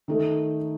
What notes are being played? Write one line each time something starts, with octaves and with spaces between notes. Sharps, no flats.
D#3 A3 D#4 A4